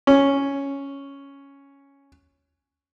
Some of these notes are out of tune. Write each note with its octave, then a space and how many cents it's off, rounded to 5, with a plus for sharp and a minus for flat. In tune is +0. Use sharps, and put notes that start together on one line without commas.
C#4 +0